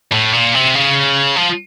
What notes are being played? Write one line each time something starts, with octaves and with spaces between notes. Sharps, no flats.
A2
A#2
C3
C#3
F3